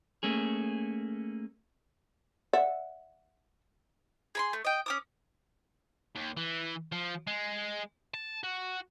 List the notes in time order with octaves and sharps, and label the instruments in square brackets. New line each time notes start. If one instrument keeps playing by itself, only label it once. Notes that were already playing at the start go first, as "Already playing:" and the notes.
[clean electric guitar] A3 A#3 C#4 G#4
[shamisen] D5 E5 F#5
[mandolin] G#4 B5 C6
A3
D#5 G5
C#4 D6 D#6
[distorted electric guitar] D#2
E3
F3
G#3
A5
F#4